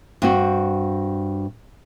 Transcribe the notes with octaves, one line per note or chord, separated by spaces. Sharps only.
G2 C4 F#4